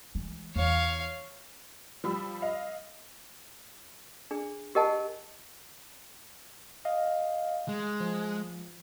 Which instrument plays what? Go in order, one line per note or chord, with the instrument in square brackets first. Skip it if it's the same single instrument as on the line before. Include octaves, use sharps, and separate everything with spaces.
[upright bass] E3 G#3
[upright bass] E2 [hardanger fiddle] C#5 F5
[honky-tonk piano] F3 G3 B5 E6
D#5 F5
[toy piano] D4 G#4
G4 A#4 D#5 F#5 G#5 A5
[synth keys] D#5 F5
[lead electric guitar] G#3
[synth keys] F3